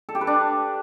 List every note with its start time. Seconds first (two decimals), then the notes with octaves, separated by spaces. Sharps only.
0.09 A4
0.15 G4
0.21 B4
0.27 D4